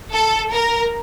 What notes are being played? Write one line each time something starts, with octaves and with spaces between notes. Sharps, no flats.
A4
A#4